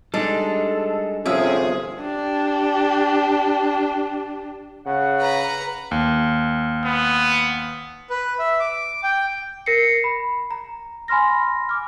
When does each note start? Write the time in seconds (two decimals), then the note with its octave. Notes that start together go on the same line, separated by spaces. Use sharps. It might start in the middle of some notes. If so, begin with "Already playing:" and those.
0.14 G3 G#3 D4 D#4 A4
1.26 G1 C3 F3 C#4 G#4 E5
2.01 D4 G4
4.86 C#3 F#5
5.20 B4 A#5
5.91 D#2
6.84 B3
8.10 B4
8.39 E5
8.60 D6
9.03 G5
9.66 A#4 A#6 C7 C#7
10.04 B5
10.51 A#5
11.08 G#5 B5 C6 F6 A#6
11.69 D6 F6